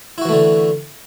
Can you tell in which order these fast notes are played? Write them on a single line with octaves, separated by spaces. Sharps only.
E4 F#4 E3 A3 D3